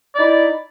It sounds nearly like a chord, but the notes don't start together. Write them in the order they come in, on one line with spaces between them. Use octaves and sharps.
D5 D#4 E4